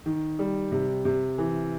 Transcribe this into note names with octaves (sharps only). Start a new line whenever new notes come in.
D#3
G3
C3
C3
E3